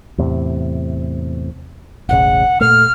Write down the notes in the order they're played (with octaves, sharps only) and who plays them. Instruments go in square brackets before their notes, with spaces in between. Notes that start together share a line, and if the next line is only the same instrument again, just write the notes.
[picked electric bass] E2 A2 C3
[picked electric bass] E1 A1 C#3 [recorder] F#5
[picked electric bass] A#2 A3 [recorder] F6